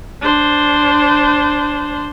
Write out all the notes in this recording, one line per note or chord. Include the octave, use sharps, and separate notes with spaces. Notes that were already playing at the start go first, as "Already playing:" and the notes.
D4 C5